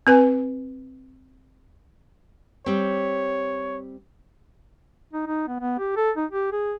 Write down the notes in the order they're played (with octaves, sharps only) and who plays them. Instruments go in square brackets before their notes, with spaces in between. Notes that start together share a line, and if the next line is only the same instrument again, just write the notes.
[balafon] C4 B4 G#5
[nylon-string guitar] G3 C4 [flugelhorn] C#5
[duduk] D#4
D#4
B3
B3
G4
A4
D#4
G4
G#4